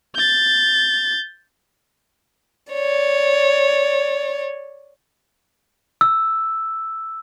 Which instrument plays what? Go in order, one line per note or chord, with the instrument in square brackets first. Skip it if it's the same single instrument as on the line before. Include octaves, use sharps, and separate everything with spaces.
[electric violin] G6 A6
[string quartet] C#5 D5
[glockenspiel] E6